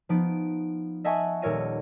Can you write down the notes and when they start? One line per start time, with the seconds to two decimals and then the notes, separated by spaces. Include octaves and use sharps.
0.09 F3 B3 D#4 D7
1.05 D#5 E5 F#5 G#5 A5 C#6
1.42 D#1 A4 A#4 C#5 A#6 D#7